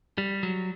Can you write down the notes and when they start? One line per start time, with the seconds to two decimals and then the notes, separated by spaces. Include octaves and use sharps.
0.18 G3
0.43 F#3